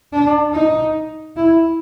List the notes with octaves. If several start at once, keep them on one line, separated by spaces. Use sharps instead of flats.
D4
D#4
E4